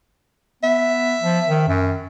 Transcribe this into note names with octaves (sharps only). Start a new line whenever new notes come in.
B3 E5
F3
D#3
F#2